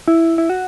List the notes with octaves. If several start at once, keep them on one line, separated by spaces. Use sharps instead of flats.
E4
E4
F#4